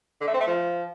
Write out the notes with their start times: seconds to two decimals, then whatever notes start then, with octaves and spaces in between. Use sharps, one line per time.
0.21 D3
0.27 A3
0.34 C4
0.40 A3
0.47 F3